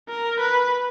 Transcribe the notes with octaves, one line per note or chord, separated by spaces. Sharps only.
A#4
B4